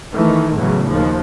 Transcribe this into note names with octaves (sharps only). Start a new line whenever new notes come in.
D#3 E3 A3
E2 A2 C#3 F#3
D#2 F3